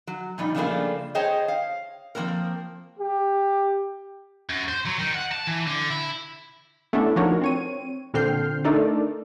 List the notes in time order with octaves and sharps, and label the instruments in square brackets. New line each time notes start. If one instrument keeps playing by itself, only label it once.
[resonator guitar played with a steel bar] F#3
A#2 F3 G3 D#4
C#3 F3 G3 A3 A#3 D4
G#4 C5 C#5 D#5 G5 A5
F5
F3 G#3 A#3 C4 A#4
[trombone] G4
[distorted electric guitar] F#2
C5
F#3
D#3
F#5
A5
E3
D3
E4
[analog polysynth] A3 B3 C#4 D4 E4 A4
F3 D4 D#4 F#4 A#4 C#5
C4 C#5 D#7
A#2 D3 C4 F6 G6 C7
A3 D4 D#4 A4 A#4 D5